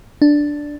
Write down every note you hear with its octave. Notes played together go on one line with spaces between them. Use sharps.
D4